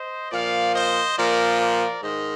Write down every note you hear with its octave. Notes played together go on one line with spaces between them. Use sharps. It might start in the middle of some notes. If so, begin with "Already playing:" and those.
Already playing: C5 D#5
A#2 F3 D5 F5
C5 D#5
A#2 F3 A#4 D5
A#4 D5
G#2 D#3 C5 D#5